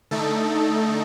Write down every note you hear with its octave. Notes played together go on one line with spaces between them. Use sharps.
D3 A3 D#4 A4